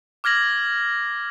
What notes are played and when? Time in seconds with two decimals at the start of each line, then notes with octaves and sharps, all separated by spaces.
0.24 D6 F6 G#6 A#6 F#7